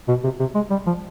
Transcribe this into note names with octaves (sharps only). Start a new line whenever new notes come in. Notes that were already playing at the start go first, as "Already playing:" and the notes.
B2
C3
C3
G#3
G3
F3